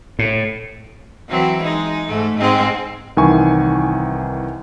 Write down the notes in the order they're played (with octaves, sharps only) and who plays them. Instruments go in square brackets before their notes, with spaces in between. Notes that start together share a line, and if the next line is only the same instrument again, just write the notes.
[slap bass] A2
[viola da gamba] E3 F#3 C4
G#3 D#4
G#2 A3
G#2 G#3 C4
[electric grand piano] C2 D#3 E3 G#5 C#6